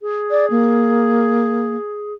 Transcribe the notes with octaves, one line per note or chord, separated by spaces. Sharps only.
G#4
D5
A#3